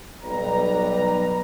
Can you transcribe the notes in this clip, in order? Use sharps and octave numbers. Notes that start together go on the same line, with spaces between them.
B1 G3 B4 A#5